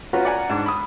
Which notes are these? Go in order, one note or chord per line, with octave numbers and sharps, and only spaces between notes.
C#4 F4 F#4 B4 A#5
D5 F#5 G#5 A#5
G#2 D4
B5 D#6